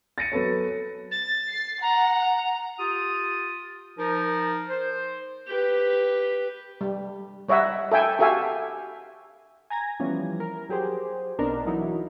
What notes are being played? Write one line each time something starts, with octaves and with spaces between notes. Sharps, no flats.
A6 A#6 C#7 D#7
F#3 B3 A4 C#5
A6
C7
F#5 A#5
F4 G4 D#6
F3 D#4 A#4
C5
G4 B4
G3
G3 C#5 D#5 E5 F#5
A4 E5 G5 G#5
F#4 G4 A4 E5 F5 G#5
G#5 A#5 G#6 A#6
E3 F3 G3 B3 C#4
A#4
F#3 G4 G#4 C5
B1 B3 C4 D4 D#4 A#4
E3 F#3 D#4 E4 F#4